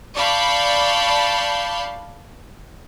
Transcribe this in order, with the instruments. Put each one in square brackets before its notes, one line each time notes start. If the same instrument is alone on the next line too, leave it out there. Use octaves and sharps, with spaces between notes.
[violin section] D5 F5 A5 B5 C#6 G6